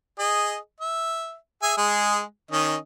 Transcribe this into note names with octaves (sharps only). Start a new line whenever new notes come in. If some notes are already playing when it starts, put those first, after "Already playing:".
G#4 D#5
E5
G#4 E5 G#5
G#3 G#4
D#3 C#4 D#5